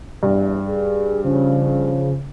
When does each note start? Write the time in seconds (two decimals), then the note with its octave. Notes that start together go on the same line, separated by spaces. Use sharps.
0.23 E2 G2
0.68 G#4
1.24 C#3 F3